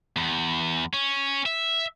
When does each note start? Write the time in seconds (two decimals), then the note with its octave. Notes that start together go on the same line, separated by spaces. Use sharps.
0.16 E2
0.93 C#4
1.46 E5